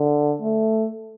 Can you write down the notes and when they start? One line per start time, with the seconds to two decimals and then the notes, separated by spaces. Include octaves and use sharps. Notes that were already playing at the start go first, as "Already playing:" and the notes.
Already playing: D3
0.42 A3